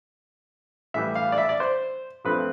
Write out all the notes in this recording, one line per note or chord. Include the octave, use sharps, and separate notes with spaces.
A2 E3 G3 E5
F5
D5
E5
D5
C5
G2 F3 A3 C4 B4